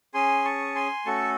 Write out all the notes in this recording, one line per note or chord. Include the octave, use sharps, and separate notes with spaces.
C#4 G#4 G#5 C6
A5 C#6
G#5 C6
A3 C#4 F#4 A4 A5 C#6